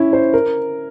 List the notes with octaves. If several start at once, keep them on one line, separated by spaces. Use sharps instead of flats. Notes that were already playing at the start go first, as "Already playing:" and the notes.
Already playing: C#4 E4
C5
A#4